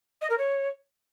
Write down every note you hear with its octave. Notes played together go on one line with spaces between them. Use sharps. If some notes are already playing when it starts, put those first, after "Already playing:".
D#5
A#4
C#5